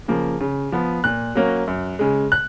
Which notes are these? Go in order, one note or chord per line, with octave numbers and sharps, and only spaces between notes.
C#3 F3 A#3
C#3
F3 B3
A#2 F#6
F#3 A#3 C#4
F#2
C#3 G#3
F#6